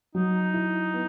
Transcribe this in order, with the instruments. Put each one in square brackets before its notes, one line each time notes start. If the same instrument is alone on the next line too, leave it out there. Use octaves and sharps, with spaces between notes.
[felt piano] F#3 [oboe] D#4
[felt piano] E4
B3